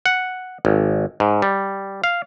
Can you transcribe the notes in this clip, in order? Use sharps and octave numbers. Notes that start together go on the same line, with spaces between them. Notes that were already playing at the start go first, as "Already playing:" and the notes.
F#5
G#1
G#2
G3
F5